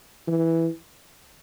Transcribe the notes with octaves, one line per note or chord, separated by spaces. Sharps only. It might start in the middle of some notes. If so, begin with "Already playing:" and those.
E3